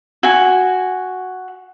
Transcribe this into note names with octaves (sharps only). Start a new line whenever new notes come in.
F#4 G#5